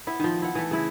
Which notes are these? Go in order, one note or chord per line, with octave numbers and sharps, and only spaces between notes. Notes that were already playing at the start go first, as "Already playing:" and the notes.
B3 E4 E5
D#3 F3
E4 F#5
E3 A3
C#3 E4 E5